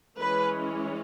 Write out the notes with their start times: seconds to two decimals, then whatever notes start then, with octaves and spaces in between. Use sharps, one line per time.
0.17 E3 G#3 C#4 B4